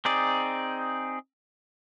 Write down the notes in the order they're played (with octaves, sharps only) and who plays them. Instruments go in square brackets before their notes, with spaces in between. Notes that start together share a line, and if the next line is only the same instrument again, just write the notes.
[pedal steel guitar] C4 D#4 G#4 D5